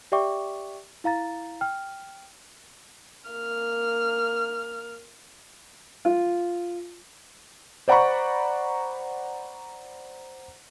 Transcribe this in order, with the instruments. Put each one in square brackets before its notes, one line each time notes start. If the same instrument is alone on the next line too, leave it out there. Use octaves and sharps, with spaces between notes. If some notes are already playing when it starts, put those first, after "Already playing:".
[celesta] G4 D5 E5 G5 C#6 D6
E4 F5 A#5 A6
G5 F6
[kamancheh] A#3 F6
[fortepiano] F4
[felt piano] C5 D5 F#5 A#5 B5 C#6